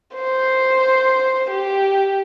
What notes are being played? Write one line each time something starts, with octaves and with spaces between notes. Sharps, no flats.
C5
G4